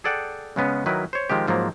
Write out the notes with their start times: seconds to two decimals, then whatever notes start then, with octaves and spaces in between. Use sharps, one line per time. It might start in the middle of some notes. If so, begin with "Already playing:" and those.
0.04 G#4 A4 D5 F#5 G5
0.56 C#3 G#3 B3 C#4
0.86 D#3 F#3 E4 A#4 B4
1.13 C5 C#5
1.30 D#3 F3 G#3 G4
1.48 G#2 F3 F#3 A#3